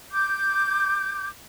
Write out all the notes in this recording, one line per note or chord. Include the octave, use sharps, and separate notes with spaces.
D6 G6